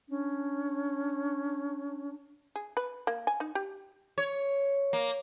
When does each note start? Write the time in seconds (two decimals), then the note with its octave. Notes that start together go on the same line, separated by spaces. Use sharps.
0.09 C#4 D4
2.56 G#4
2.77 B4
3.07 A#3
3.27 G#5
3.40 D#4
3.55 G4
4.18 C#5
4.93 A#3